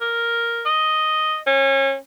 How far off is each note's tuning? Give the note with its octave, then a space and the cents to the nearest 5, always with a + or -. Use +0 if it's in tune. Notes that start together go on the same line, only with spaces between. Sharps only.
A#4 +0
D#5 +0
C#4 -30